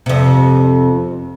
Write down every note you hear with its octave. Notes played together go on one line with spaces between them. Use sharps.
F2 C3